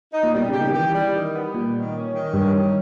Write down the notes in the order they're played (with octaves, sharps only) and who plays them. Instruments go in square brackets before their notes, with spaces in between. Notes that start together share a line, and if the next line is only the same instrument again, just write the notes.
[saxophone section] D#4
[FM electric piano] A#2
[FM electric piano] B2 [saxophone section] G3
[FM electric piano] C#3 [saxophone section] G4
[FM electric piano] D#3
[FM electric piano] E3 [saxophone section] G4
[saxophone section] G3
D#3
B3
[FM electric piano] A#2 [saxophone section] G3
[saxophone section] D#3
C#4
D#3
[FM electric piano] G2 [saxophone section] C#4
[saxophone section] D#3